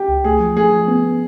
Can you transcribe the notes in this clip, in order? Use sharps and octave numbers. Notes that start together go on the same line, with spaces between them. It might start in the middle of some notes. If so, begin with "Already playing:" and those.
Already playing: G4
C#2
A3 G#4
F3
A3 G#4
F3
B3